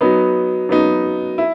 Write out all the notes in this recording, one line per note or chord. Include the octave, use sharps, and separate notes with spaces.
F#3 B3 D#4
F#3 B3 D#4
E4